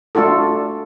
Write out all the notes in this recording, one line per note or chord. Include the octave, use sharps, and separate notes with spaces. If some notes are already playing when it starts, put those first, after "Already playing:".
A3 D4 F4 F#4 A4